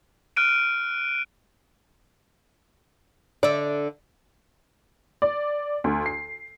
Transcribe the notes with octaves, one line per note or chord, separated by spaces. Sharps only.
F6 F#6 D7 D#7
D3 D5 E5
D5
D2
C7